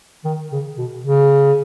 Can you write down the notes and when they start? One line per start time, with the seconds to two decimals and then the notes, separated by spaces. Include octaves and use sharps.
0.24 D#3
0.52 C#3
0.77 B2
1.04 C#3